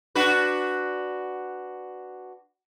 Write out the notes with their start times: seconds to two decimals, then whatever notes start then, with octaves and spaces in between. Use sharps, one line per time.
0.15 D4 F#4 B4